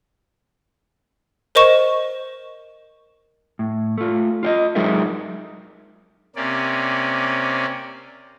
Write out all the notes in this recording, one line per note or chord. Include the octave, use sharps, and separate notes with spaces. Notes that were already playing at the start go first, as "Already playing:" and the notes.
A#4 C5 D#5 C#6 E7
A2
A3 F4
F4 D5 D#5
F#3 G#3 D#4 G#4 A#4 E5
C3 A#3 C#4 D5